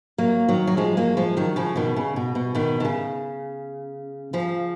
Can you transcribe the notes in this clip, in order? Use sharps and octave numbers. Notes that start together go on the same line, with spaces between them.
F#3 A#3
D#3 F#3
F#3
F3 G#3
F#3 A#3
F3 G#3
D#3 F#3
C#3 F3
B2 D#3
C#3
B2
B2
B2 D#3
D#3
C#3
C#3 F3